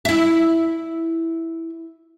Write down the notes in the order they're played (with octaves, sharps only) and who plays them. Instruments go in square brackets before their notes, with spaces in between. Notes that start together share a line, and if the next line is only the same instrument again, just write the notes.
[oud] E4 E5